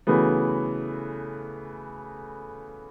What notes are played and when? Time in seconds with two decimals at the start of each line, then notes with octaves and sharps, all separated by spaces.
0.07 C#3 E3 F#3 A3 B3